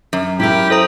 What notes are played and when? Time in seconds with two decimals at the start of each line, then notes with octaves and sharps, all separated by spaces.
0.13 F#2
0.40 E4 G4 A#4
0.70 A4 C5 D#5 A#5